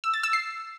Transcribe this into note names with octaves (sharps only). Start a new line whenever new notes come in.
E6
A6
E6
C7